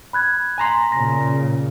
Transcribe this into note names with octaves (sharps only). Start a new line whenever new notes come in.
B5 F#6 G#6
G#5 A#5 C6
A#2 C#3 A#6